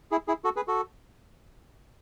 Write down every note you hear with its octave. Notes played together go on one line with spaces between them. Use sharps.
E4 G#4
E4 G#4
F#4 A4
G#4 B4
F#4 A4